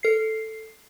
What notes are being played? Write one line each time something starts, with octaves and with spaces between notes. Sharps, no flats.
A4 C7